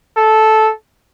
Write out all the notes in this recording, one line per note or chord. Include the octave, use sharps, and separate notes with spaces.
A4